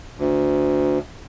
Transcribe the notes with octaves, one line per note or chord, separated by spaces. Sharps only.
D2